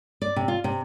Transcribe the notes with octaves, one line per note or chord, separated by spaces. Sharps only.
D5
C3
F4
C3